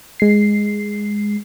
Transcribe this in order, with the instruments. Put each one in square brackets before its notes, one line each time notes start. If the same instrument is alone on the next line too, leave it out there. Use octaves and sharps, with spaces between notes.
[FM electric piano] G#3 C7